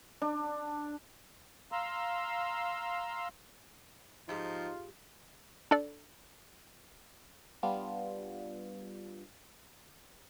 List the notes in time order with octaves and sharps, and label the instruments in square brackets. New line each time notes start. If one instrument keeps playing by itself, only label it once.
[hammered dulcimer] D4
[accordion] F5 A#5 C6 E6
[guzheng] G#2 G4 [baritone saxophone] F3 [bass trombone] D#4 [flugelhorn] F4
[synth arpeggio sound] D4 A4 D5
[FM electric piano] G3 B3 D4 F4